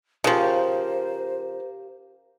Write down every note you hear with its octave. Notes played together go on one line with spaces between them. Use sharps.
C#3 F3 G4 A#4 C5 F5